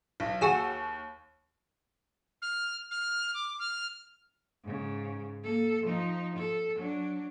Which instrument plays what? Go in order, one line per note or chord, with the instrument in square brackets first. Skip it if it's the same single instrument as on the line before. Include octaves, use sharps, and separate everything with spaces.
[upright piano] B1
[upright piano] D#2 [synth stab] F#4 G#4 E6
[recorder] F6
F6
D6
F6
[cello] G#2 C#3
A#3 A4
F3 D#4
A4
F#3 D4